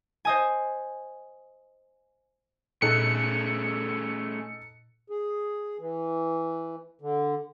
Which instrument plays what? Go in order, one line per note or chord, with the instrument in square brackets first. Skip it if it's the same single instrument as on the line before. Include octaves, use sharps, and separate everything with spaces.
[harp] C5 D#5 G#5
[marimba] A#2 [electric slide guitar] A3 C#4 G#4 [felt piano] D#4 A4 F#6 [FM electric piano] C#7
[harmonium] G#4
E3
D3